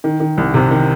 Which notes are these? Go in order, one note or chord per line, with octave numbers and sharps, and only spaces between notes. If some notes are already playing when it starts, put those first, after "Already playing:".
D#3
D#3
C2
C3
D#3